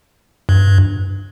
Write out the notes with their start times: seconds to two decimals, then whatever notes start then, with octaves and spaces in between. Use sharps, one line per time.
0.49 G2